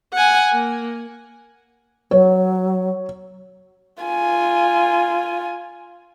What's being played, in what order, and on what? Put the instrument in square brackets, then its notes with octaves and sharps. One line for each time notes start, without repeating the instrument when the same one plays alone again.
[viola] F#5 G#5
A#3
[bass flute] F#3 [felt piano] C#5
[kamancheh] F4 G#5